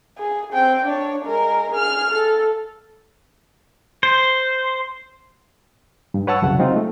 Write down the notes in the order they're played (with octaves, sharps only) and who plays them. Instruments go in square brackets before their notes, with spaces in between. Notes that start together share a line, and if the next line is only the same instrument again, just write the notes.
[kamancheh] G#4
C4 G5
D4 C#5
G#3 A#4
G#4 F6
A4
[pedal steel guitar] C5
[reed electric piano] G2
B4 C#5 F#5 A5 C#6 E6
C2 F#2 C#3 F#5
F#3 G#3 C4 D#4 F4
A3